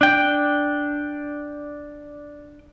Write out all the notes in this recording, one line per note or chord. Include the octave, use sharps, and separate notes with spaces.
D4 G5